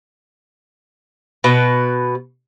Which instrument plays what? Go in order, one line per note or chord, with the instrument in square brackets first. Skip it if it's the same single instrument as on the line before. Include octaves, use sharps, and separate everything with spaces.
[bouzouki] B2 B4